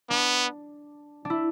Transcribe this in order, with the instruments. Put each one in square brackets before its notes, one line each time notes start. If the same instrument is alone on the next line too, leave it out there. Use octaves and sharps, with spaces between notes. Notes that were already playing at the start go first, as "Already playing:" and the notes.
[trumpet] B3 [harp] D4
[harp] D4 E4